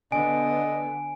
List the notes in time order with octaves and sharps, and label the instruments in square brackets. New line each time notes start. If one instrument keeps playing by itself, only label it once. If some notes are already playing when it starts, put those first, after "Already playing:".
[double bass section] D3 B3 [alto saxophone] D#5 [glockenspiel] G#5 D7